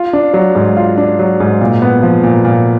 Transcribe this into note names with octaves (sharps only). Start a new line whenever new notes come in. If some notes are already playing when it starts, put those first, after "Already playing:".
Already playing: F4
D4
F#3
G#2
F4
D4
F#3
G#2
A#2
B3
F3
A#2
A#2